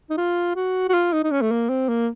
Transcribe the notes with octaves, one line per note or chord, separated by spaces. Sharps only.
D#4
F4
F#4
F#4
F4
D#4
D#4
C#4
A3
A#3
C4
A#3